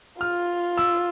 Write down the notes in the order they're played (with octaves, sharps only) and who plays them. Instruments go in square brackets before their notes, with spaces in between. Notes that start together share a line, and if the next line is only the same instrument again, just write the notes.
[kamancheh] F4 [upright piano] F6
[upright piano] E6